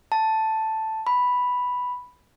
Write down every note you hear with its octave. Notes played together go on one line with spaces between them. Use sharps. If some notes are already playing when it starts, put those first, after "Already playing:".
A5
B5